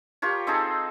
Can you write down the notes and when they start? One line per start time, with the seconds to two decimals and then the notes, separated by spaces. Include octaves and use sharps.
0.22 F4 G4 A#4 C#5
0.47 C4 D#4 G#4 A4